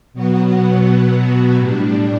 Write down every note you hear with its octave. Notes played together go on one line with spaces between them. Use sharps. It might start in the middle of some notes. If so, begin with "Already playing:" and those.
B2 F#3 B3 F#4
A2 G3 D4